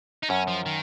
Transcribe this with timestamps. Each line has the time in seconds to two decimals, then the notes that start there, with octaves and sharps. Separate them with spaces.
0.23 D#4
0.30 F#2 C#4
0.48 F3
0.66 D#3